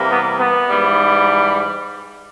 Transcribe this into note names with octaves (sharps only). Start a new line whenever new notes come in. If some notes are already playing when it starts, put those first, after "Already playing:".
Already playing: C3 E3 G3 A#3
B3
B3
G#2 E3 G3